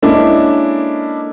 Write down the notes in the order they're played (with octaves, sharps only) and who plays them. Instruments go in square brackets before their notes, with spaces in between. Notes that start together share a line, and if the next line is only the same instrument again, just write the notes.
[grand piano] G#3 A#3 C#4 D4 E4 A4